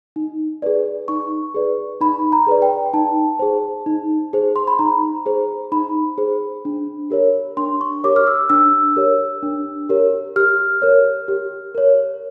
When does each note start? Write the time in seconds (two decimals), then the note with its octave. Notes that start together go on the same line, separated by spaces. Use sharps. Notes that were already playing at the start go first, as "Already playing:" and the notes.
0.16 D#4
0.62 G#4 B4 D5
1.08 D#4 C#6
1.55 G#4 B4 D5
2.01 D#4 B5
2.32 A#5
2.47 G#4 B4 D5
2.62 G5
2.93 D#4 A5
3.39 G#4 C5
3.86 D#4
4.33 G#4 C5
4.56 C6
4.67 B5
4.79 D#4 A#5
5.26 G#4 C5
5.72 D#4 B5
6.18 G#4 C5
6.65 D4
7.10 G4 A#4 C#5
7.57 D4 C6
7.81 C#6
8.04 G4 A#4 C#5 D6
8.16 F6
8.27 E6
8.50 D4 E6
8.96 G4 A#4 C#5
9.43 D4
9.89 G4 A#4 C#5
10.36 G4 F6
10.82 A#4 C#5
11.28 G4
11.75 A#4 C#5